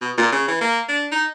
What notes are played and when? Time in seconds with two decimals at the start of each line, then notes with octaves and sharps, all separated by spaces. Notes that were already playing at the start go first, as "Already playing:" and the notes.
0.01 B2
0.18 A#2
0.32 C#3
0.48 E3
0.61 A#3
0.89 D4
1.12 D#4